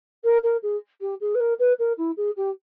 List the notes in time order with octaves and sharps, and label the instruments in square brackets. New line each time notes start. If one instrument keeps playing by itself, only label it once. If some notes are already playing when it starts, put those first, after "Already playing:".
[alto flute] A#4
A#4
G#4
G4
G#4
B4
A#4
B4
A#4
E4
G#4
G4